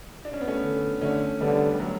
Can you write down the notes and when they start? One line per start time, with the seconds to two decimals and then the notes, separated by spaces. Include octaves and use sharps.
0.25 D4
0.33 C#4
0.41 B3
0.48 A3 C#4
0.64 D3
1.01 D3 A3 C#4
1.41 D3 G3 B3
1.74 G3
1.80 F#3 A3